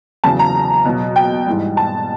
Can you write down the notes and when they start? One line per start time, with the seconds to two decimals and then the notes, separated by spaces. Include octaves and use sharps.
0.24 E2 C#3 F#3 A5
0.39 A#5
0.85 B2 F#3
1.16 G5
1.47 G#2 E3 G3
1.77 A5